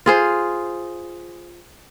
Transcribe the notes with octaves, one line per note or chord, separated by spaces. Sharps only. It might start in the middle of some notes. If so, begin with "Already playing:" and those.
F4 G#4 C5